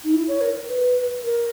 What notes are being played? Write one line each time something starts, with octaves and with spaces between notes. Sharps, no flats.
D#4
E4
C#5
A#4
B4
A#4